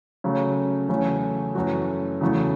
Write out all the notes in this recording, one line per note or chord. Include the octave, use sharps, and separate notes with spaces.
C#3 F#3 A3
E2 C#3 F#3 A3 C#4
F#2 E3 A3 F#4
E2 C#3 F#3 A3